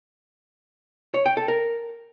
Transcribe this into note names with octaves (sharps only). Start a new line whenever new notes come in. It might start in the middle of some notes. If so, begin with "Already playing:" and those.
C#5
G5
A4
A#4